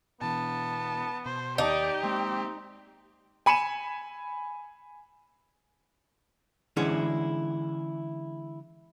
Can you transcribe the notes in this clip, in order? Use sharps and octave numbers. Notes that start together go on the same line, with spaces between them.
B2 E3 B3 A5
B2 C5
D#2 D#4 G4 D5
G#3 A#3 C4
G#5 B5 C#7 D#7 E7
D3 E3 G#3 C#4 E4 G#4